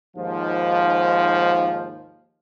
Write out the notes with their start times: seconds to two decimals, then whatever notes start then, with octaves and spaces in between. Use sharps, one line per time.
0.17 D#2 G#2 F3